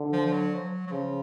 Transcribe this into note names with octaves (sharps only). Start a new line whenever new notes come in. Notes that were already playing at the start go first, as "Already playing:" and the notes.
Already playing: D3
F3
F3
F#3
F3
F#3
F#3
C#3 F3